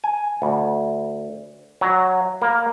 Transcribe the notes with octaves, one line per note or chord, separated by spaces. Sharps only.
G#5
D2
F#3
A#3